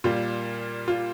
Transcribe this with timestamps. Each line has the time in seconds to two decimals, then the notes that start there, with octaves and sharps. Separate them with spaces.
0.04 A#2 G3 A#3 F4
0.88 F4